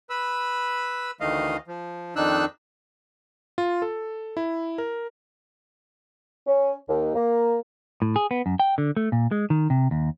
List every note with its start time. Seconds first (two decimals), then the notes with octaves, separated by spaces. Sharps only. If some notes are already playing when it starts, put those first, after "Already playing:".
0.10 B4 B5 E6
1.21 D2 D#3 E3 A3 D#5 F5
1.68 F3
2.16 F2 D#3 D4 D#4 E6 F#6
3.58 F4
3.82 A4
4.37 E4
4.78 A#4
6.47 C#4
6.88 D#2
7.15 A#3
8.02 A2
8.16 G#4
8.31 B3
8.46 F#2
8.60 G5
8.78 D3
8.97 A3
9.12 A#2
9.31 G#3
9.50 D#3
9.70 C3
9.91 D#2